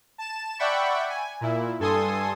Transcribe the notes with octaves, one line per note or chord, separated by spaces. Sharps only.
A5 E7
D5 E5 F#5 G5 B5 C#6
G#5
A#2 E4
G2 A4 G#5 C6 D#6